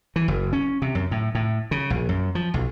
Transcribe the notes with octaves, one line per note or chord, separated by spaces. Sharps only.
E3
F#1
C#4
C3
F#2
A2
A2
C#3
A#1
F#2
F3
B1